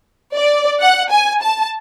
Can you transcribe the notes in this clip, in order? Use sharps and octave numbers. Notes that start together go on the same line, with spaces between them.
D5
F#5
G#5
A5